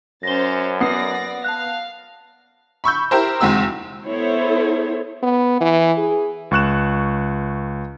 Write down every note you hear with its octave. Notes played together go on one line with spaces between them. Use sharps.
F#2 C#4 C5 A6 A#6 G7
B3 D5 D#6 A#6 C7
F5 A5 F#6
B5 C#6 E6 G6
E4 G4 A#4 C5
F1 E2 G#3 C4 F#4 E6
B3 E4 A4 C5 C#5
B3
E3
G#4
C#2 C#6 F#6 E7